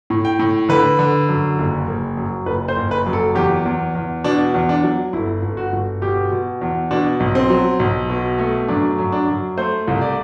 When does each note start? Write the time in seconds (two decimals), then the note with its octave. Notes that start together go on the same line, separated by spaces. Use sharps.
0.10 A2
0.25 G5
0.39 A2
0.69 D3 B4
0.99 D3
1.29 F#2
1.58 F#1
1.87 F#1
2.17 F#2
2.46 F#1 B4
2.68 C5
2.76 F#1
2.91 B4
3.06 F#2
3.13 A4
3.35 E2 G4
3.65 E2
3.95 E2
4.24 B2 D4
4.54 E2
4.69 D4
4.84 F#3
5.13 G1 E4
5.42 G1
5.57 F#4
5.73 G1
6.02 B2 G4
6.32 B2
6.61 E2
6.91 B2 D4
7.20 B1
7.35 C4
7.50 F#3
7.80 B1
8.10 B2
8.38 A3
8.68 F#2 D4
8.99 F#2
9.12 D4
9.28 F#2
9.58 A3 C5
9.87 C2
10.01 D5